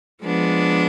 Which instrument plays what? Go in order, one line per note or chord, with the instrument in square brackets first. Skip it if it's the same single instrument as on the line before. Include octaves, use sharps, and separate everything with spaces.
[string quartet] F3 G#3 B3 D4